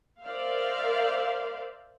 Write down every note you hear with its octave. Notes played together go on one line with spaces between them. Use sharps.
A#4 C5 D5 E5 F5